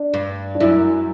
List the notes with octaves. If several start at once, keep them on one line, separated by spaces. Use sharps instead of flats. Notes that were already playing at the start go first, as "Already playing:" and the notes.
Already playing: D4
G2
D4
F#2 E4